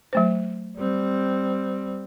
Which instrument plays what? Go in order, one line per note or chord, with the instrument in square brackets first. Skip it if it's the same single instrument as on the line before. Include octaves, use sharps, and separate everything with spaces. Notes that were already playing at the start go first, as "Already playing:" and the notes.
[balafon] F#3 A3 C5
[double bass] G3 C4